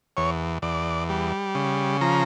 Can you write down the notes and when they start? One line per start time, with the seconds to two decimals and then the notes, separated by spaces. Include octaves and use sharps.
0.17 E2 C#5
0.62 E2 D5
1.09 G3
1.55 C#3
2.01 F3 A#5